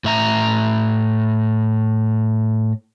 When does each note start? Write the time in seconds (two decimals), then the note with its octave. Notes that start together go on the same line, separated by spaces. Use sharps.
0.04 A2 E5 A#5